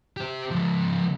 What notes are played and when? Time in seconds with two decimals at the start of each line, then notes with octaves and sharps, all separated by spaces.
0.17 G4 C5
0.51 C#2 F3